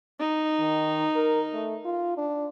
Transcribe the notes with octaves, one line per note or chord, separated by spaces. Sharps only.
D#4
D#3
A#4
A3
F4
D4